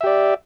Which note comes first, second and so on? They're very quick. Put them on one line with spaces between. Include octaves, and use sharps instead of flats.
E5 G4 D5